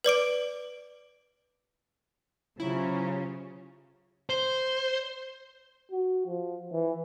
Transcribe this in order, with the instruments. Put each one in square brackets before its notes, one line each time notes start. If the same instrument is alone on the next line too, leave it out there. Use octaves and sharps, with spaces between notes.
[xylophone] B4 D5 D6 D7
[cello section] C#3 C#4 [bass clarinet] F#3 [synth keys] E4 [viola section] F4 G4 C5
[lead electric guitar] C5
[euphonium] F#4
F3
E3